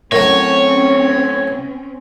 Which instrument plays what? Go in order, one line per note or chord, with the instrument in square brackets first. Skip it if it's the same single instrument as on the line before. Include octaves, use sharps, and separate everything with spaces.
[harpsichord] A2 F#3 [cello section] C4 C#4 [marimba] A#4 [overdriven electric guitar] C#5